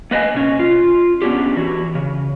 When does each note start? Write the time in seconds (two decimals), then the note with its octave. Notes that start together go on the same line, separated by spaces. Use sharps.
0.11 A#3 B4 D#5 F5 G#5
0.34 B2 C#4
0.59 F4
1.22 B3 C#4 D4 G4
1.57 E3 F#4
1.95 C#3